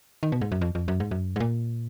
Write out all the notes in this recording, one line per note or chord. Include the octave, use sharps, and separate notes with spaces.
D#3
B2
G#2
F#2
F2
F2
F#2
G#2
F#2
G#2
A#2